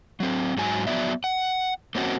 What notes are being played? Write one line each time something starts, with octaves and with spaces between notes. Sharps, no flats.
F#3 C4
G#2 F#3 G#5
F#3 B3 D5 E5
F#5
A#3 C4 C#4 F#4